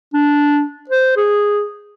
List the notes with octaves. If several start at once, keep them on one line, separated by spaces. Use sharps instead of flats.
D4
C5
G#4